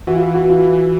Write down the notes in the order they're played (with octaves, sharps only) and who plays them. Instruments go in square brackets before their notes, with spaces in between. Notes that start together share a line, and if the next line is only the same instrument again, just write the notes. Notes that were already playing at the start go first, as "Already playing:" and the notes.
[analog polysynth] E3 [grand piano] F#4
[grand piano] F4
F#4
[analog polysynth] E3 [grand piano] F#4
[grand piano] F4
[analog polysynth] E3